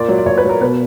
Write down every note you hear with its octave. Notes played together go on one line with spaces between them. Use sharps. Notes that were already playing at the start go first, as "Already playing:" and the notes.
Already playing: A#2 D5
F#3
D5
A#2 C#5
B4
F#3
A#4
B2 B4